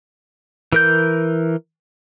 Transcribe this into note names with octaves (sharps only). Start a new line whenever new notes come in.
E3 A#4 G6